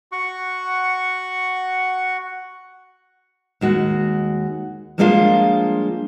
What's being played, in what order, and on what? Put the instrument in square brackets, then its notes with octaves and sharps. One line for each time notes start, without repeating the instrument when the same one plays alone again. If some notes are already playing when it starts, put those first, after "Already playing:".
[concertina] F#4 F#5 C#6
[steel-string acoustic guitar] D#2 G#3 F#4
F3 G3 G#3 A#3 D4 F4